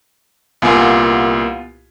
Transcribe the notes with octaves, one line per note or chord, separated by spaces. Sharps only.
C2 A#2 B3 F4 G#5